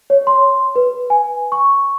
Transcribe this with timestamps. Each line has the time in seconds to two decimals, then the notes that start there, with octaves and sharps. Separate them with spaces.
0.10 C#5
0.27 C6
0.76 B4
1.10 G#5
1.52 C#6